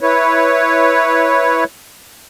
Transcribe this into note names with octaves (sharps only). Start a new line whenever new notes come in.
E4 B4 C#5